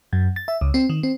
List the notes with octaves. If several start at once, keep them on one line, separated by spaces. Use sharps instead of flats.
F#2
A6
E5
C#2
C4
D#3
C4